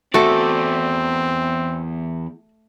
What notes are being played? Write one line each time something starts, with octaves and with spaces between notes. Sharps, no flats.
E2 A3 C4 F#4 A4 D5